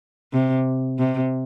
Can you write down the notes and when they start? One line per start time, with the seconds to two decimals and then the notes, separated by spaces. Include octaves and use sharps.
0.32 C3
0.98 C3